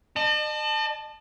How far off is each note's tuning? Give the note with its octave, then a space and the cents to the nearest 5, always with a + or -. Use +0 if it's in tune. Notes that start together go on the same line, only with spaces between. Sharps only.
D#5 -45 A5 +0